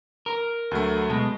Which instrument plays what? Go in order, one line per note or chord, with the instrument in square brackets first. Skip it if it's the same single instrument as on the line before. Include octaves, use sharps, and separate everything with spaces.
[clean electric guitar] A#4
[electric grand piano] D2 F#3 A3
[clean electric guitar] B2 G#3 [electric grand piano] A5